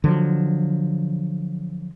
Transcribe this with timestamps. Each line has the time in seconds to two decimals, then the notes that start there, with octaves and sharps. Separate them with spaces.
0.04 D3 F3 F#3